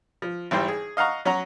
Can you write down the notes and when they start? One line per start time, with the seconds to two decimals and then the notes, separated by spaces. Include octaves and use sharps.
0.22 F3
0.51 G#1 E3 G3 C5 G5
0.68 G#4
0.97 D#5 F5 F#5 A#5 C#6
1.25 F#3 C#4 F#4 F#5 A#5